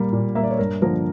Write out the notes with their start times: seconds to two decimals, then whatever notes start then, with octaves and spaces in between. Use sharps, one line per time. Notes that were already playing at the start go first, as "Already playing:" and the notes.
Already playing: A#2 G3 A#3
0.13 A#2
0.35 G3 A#3 E5
0.43 D5
0.51 C#5
0.59 G2 A#4
0.82 D3 F3 A#3 A#4